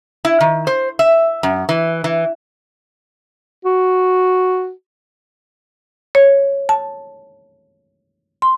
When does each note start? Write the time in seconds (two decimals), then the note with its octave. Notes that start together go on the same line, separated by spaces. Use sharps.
0.25 E4
0.40 D#3
0.67 C5
0.99 E5
1.43 F#2
1.69 E3
2.04 E3
3.65 F#4
6.15 C#5
6.69 A5
8.42 C6